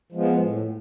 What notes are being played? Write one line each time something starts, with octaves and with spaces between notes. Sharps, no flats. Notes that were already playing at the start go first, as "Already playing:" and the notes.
F3 G#3 B3
A2